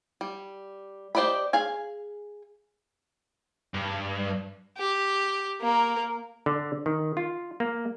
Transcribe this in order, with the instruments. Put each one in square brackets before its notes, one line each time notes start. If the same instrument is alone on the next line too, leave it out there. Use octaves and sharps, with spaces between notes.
[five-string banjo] G3
G4 C5 D5 D#5 B5
G#4 F5 G#5
[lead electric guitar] G2
[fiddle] G4
A#3 A#4
[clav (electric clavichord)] D3
D#3
F4
A#3